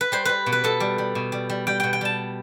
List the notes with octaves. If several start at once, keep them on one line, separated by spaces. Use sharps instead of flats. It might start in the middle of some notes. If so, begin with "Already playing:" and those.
B4
G3 C5
G3 B4
B2
B4
B2 A4
G3
G3
B2
G3
G3
G3 G5
B2 G5
G5
G3 A5